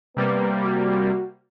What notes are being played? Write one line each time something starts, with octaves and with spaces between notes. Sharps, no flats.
C3 G3 A#3 B3
F#4